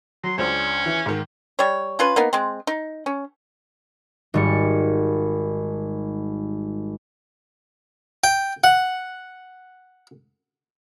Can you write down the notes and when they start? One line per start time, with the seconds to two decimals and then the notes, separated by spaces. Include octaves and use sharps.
0.24 F#3 C6
0.38 C#2 C#4 D4 C5
0.86 E3
1.06 G#2 D#3
1.59 G3 C#5
1.99 C#4 F4 B4
2.16 A#3 B3 D#4
2.33 G#3 C4
2.67 D#4
3.06 C#4
4.34 G#1 G3 C#7
8.24 G5
8.64 F#5